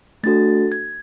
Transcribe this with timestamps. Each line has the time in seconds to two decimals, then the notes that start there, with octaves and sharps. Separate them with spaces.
0.23 A3 D4 F#4 A4 A6
0.72 G#6